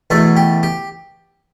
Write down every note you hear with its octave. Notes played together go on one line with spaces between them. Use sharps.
E2 B2 A3 A4
G4
G4